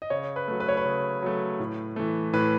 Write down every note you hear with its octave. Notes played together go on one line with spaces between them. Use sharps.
D#5
C#3 C#5
B4
F#3 A3
B4
C#5
B4
C#3
F#3 A3
A2
E3 A3
A2 B4